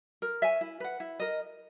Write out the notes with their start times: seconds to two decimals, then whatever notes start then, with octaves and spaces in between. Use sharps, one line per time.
0.22 A#4
0.42 C#5 E5 G#5
0.61 E4
0.80 B4 F#5
1.00 E4
1.20 A#4 D#5